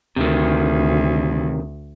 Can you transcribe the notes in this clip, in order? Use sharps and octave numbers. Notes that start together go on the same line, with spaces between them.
D2 C3 D#3